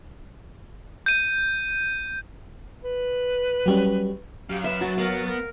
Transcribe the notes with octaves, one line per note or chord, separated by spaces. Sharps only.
G6 D#7
B4
F#3 G3 C#4
F#2 G4 F5
B4 E5
F#3 F#4 A6
B3 A#4 F5
A#4